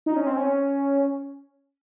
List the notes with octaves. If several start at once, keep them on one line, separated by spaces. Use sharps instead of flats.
D#4
C#4
C4
C#4